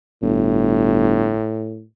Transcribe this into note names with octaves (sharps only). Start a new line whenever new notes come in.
G1 A2